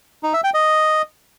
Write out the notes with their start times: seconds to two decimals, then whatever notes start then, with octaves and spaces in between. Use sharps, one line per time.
0.23 D#4
0.33 E5
0.44 G5
0.54 D#5